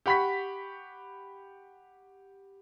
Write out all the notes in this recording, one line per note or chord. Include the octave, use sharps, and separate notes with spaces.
G4 F#5 B5 C#6 B6